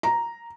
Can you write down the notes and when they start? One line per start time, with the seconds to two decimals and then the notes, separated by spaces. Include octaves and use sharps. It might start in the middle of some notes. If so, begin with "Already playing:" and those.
0.03 A#5